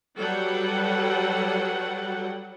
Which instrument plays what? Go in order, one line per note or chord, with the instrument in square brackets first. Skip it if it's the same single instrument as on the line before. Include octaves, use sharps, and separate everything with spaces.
[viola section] F#3 G3 A4 B4 F#5 G5